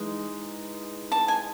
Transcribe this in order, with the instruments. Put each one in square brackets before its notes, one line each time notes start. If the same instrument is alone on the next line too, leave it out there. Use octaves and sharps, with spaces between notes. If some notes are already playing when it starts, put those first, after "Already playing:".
Already playing: [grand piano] E3 G#3 D#4
[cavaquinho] A5
G#5